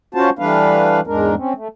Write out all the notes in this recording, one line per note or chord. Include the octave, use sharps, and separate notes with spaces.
C#4 F4 F#4 C5 A5
E3 G3 A3 D4 B4 F5
E2 G#2 G#3 D4 A#4
C4 C#4
A3